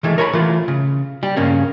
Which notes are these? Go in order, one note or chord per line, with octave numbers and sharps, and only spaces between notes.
D#3 E3 G#3 A3
A#4 C#5 G#5 B5
E3 A3 F4
C#3
G3 G4
G2 C#3 A#3 C#4